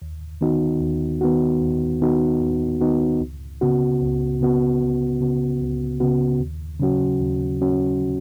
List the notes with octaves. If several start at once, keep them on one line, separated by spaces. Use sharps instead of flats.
D#2
D#3 B3 D#4 F#4
D#2
D#3 B3 D#4 F#4
D#2
D#3 B3 D#4 F#4
D#2
D#3 B3 D#4 F#4
C#2
C#3 B3 F#4
C#2
C#3 B3 F#4
C#2
C#3 B3 F#4
C#2
C#3 B3 F#4
D#2
C#3 F#3 C#4 F#4
D#2
C#3 F#3 C#4 F#4